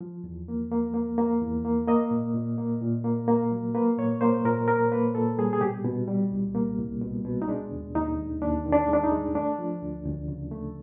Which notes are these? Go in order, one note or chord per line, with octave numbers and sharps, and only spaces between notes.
F3
E2
A#3
A#3
A#3
A#3
E2
A#3
A#3 D#5
A#2
A#2
A#3
A#2
A#3
A#3
F#3
A#3 B4
A#2 C#5
A#3 C5
A#2 A#4
A#3 A#4
A#3 B4
A#2 A4
G3 G#4
G#4
B2 G4
B2
G3
C2
A#3
C2
B2
B2
D#4
G#3 D4
D#2
D#2 D#4
D#2
D#2 D4
D#3
D4
G#3
D4
D#4
G#3
A3 D4
F3
D2
D2
C#3
A3